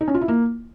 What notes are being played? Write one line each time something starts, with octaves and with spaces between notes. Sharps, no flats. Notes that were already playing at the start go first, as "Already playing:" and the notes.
D#4
C#4
F4
E4
A#3